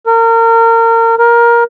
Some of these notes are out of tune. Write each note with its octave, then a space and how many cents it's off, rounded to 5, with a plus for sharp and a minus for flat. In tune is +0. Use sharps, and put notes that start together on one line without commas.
A#4 -30
A#4 +15